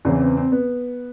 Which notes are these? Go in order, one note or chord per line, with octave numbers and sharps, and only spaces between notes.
E2 C#3 E3 C4
C4
C4
B3